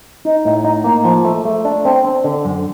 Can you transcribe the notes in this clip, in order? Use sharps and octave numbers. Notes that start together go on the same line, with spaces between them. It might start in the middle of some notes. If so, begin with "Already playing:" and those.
D#4
A2
D#4
A#3
F3
A3
A3
D4
C4
C4
D3
F#2